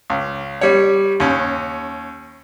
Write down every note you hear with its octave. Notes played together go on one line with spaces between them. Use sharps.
C#2
G3 C#5
D#2 C#4